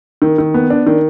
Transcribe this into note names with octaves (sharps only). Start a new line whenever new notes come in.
D#3
D#3
B3
D4
D#3